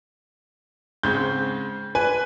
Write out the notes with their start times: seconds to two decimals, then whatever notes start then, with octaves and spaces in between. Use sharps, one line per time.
1.03 G#2 C#3 C4 G6
1.95 B4 G#5